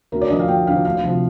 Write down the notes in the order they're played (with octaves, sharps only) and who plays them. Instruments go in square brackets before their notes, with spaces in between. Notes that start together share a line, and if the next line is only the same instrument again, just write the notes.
[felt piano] D2 A#4
D5
D3 F3 D#5
F5
D2 G5
D3 F3 F5
D2 F5
C3 F3